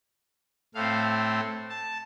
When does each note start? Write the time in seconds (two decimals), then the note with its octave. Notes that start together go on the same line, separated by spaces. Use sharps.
0.75 A2 A3 C4 F5
1.69 A5